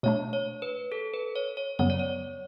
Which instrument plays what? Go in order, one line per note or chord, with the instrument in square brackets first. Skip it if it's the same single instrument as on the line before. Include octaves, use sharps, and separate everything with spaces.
[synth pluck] B2 A3 D4 [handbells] C#5
[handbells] C#5
B4
A4
B4
C#5
C#5
[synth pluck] F#2 C#3 F#3 B3 [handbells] C#5
[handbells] D5
C#5